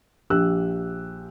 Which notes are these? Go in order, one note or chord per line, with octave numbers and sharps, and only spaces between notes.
A#1 G4 E6 F#6